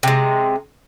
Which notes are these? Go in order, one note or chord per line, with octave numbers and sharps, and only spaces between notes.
C3 G#3